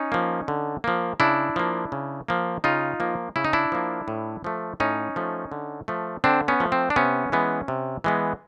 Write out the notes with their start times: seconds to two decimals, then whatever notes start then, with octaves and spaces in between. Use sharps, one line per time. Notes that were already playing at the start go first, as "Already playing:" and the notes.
Already playing: C#4 D#4
0.12 F3 A#3
0.48 D3
0.84 F3 A#3
1.20 C#3 D4 E4
1.56 F3 A#3
1.92 C#3
2.28 F3 A#3
2.64 C#3 D#4 F4
3.00 F3 A#3
3.36 C#3 E4
3.45 D#4
3.53 D4 E4
3.72 F3 A#3
4.08 A2
4.44 F3 A3
4.80 A2 C#4 D#4
5.16 F3 A3
5.52 D3
5.88 F3 A3
6.24 D3 C4 D4
6.48 B3 C#4
6.60 F3 A3
6.72 C4
6.90 D4
6.96 C3 B3 C#4
7.32 E3 G#3 B3
7.68 C3
8.04 E3 G#3 B3